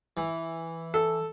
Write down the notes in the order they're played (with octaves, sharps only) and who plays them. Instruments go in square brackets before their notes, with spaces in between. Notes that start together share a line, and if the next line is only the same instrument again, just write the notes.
[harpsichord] E3
[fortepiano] A4